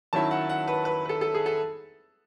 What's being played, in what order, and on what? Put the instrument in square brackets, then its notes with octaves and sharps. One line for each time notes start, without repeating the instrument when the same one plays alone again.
[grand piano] D#3 F#3 C#4 E4 A5
F#5
F#5
B4
B4
B4
A4
A4
G#4
A4